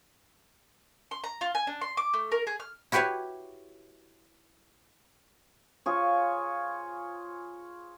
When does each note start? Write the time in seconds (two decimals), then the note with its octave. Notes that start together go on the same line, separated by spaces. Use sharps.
1.11 C6
1.24 A#5
1.41 F4
1.55 G#5
1.67 D4
1.82 C6
1.97 D6
2.14 A3
2.32 A#4
2.47 G#4
2.60 F6
2.92 E4 F#4 G4 B4 C#5
5.86 F4 G#4 C#5